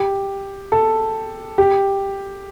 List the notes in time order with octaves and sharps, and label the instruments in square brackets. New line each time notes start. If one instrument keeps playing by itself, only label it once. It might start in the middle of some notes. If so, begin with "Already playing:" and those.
Already playing: [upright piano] G4
A4
G4